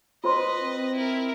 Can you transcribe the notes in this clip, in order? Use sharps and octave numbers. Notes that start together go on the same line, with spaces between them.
F4 B4 C5 D#5 C6
C4
E4 A#4